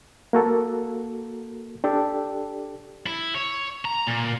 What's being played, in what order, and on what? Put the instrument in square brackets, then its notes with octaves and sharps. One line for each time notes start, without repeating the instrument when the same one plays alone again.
[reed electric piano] A#3 F#4 A4 A#4
D4 G4 A4
[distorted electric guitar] E4
C#5
A#5
A#2